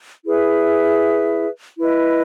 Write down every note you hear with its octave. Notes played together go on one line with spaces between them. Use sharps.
E4 G#4 B4 E5
E4 B4 D#5